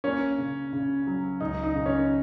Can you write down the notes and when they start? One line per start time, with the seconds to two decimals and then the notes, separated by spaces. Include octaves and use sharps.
0.04 A#3 C#4
0.38 C#3
0.73 C#3
1.07 F#3
1.40 C#2 D#4
1.63 D#4
1.75 C#3
1.86 C#4